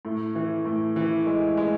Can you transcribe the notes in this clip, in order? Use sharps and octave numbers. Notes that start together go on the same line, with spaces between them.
A2
E3
A2
E3
G#3
G#3